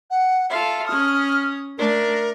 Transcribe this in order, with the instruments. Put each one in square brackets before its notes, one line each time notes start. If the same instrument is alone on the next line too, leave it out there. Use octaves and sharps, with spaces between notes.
[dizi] F#5
[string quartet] F4 A4 F5 [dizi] E5
[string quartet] C#4 D#6 [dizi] F6
[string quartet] A3 D4 [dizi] A#4